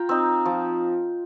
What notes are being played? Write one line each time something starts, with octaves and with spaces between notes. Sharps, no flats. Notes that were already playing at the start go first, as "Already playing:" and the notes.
Already playing: F4 G5 A#5
C4 D#4
F3